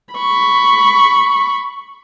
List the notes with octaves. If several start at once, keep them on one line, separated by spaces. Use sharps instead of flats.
B5 C#6